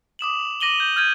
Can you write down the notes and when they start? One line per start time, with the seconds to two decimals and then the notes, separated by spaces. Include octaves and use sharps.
0.19 D6 D#6 E7 F#7
0.60 D6 A#6 D#7 F#7 G7
0.80 G6
0.96 F6 G6 G#6 D#7